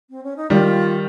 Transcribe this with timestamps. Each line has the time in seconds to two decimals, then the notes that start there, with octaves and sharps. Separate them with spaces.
0.10 C4
0.24 C#4
0.37 D#4
0.50 D#3 G3 F4